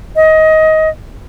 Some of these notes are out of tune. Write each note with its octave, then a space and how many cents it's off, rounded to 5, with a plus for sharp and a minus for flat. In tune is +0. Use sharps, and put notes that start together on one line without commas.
D#5 +20